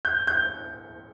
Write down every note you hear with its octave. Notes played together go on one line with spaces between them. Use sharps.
G6
G6